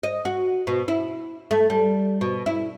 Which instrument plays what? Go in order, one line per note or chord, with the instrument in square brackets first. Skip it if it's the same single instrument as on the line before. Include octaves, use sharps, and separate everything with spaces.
[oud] D#5
F#4
B2
E4
A3
G3
B2
E4